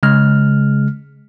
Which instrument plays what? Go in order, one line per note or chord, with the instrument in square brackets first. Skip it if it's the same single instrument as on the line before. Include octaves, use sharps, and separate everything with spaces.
[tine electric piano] C#3 G#3 F6